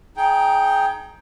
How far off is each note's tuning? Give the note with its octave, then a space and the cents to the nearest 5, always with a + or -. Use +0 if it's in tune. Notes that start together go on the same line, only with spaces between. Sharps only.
D#4 +0 G#4 +25 G5 +0